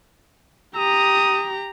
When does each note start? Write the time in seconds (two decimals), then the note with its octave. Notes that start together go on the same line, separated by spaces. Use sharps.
0.76 G4 A#5 D#6